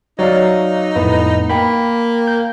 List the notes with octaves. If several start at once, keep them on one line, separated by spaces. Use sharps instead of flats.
F#3 D#4 C#5 D5 F5
F2 A2 A3 B3
A#3 G5 B5
G6